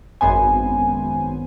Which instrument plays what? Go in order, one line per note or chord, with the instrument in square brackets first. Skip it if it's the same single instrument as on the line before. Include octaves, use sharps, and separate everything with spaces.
[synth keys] G#1 F#2 B3 C5 G#5